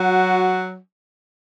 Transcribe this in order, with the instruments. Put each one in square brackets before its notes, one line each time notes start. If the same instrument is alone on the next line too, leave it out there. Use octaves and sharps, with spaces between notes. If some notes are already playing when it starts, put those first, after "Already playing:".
Already playing: [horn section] F#3 F#4